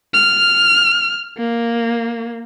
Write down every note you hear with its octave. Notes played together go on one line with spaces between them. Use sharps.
F6
A#3